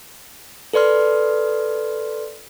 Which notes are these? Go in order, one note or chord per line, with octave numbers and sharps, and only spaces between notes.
A4 B4 D5 C6 F6